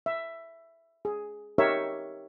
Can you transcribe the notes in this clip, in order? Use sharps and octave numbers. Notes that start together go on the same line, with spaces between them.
E5
G#4
D#4 G4 A#4 C#5 E5